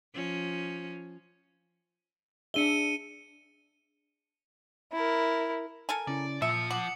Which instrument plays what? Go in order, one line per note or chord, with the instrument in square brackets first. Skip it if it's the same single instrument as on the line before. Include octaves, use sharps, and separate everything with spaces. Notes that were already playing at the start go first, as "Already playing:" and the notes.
[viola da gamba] F3 C#4
[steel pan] D4 G#4 E5 [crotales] C#7 D#7 G7
[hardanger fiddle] E4 A#4
[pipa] A4 A#4 G#5
[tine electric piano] C#3 C#4 E4 [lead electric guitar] D5
[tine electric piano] A#2 [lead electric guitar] F3 [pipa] E5 [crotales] D#6 C#7
[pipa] F#5 [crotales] D6 F#7